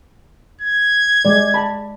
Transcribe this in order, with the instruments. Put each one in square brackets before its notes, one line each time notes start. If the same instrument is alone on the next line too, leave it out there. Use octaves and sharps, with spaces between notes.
[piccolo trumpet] G#6
[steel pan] G#3 D5
A5 B5